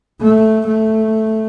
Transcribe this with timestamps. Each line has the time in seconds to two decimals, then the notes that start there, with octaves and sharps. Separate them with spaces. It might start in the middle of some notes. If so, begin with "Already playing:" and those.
0.21 A3
0.67 A3